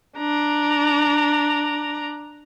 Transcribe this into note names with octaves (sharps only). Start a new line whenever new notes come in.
D4 A#5